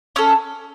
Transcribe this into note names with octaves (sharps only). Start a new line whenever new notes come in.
C#4 A4 E6